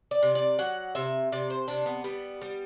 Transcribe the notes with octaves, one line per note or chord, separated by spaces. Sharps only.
D5
C3
D5
F#3 F#5
C3 E5
C3 D5
C5
C3 D4
B3
G3 B3
G3